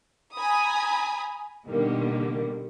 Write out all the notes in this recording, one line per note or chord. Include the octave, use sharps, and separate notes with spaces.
G#5 A#5 B5 D#6
B2 D3 D#3 G3 A#3